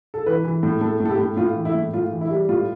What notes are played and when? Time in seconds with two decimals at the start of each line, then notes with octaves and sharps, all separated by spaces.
0.14 A4
0.26 E3 B4
0.44 E3
0.63 A2
0.81 A2 A4
1.00 A2
1.05 A4
1.10 G4
1.19 A2
1.37 A2 F4
1.55 E3
1.65 E4
1.75 A2
1.93 A2 F4
2.11 E3
2.21 E4
2.31 G3
2.49 A2 F4